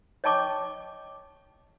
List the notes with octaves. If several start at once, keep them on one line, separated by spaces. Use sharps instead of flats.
C#5 D#5 G5 A5 C#6 D6